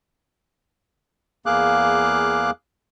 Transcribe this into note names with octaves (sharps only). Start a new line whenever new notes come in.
E2 A#3 G#4 F5 D6 F#6